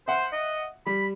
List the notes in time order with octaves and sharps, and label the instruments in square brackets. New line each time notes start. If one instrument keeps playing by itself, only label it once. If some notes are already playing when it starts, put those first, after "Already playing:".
[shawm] C5 [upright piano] E5 F#5
[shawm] D#5
[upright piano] G3 [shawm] B5